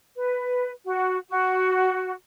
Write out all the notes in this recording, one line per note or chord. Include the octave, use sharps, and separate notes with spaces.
B4
F#4
F#4